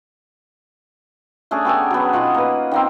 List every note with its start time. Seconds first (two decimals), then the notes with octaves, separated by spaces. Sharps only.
1.51 A3 C#4 D4 G#4
1.65 B3 G4 A4 G#5
1.91 F#3 B3
2.13 B2 D#4 F4 F#5
2.34 A#3 B4
2.71 D#3 A#3 C4